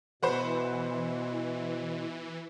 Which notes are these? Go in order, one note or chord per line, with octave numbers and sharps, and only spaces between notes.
B2 E3 F#4 B4 C5